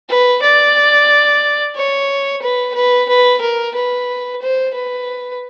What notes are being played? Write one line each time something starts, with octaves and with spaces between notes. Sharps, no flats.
B4
D5
C#5
B4
B4
B4
A#4
B4
C5
B4